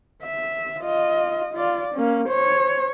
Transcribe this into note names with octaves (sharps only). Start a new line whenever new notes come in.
E5
F4 D#5
F4 D5
A#3 C#4
C5 C#5